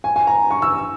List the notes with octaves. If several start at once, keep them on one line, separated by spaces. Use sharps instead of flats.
G#5
G#5
A#5
C#6
E6